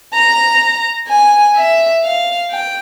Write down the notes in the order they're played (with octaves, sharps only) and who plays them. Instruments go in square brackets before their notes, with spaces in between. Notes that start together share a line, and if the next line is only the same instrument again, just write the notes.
[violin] A#5
G#5
E5
F5
G5